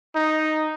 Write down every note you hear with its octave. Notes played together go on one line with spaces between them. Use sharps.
D#4